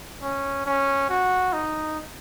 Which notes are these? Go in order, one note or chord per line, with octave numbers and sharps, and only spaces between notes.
C#4
C#4
F#4
D#4